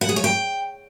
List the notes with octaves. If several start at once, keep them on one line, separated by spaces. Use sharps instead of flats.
F#5
G#4
C#5
G5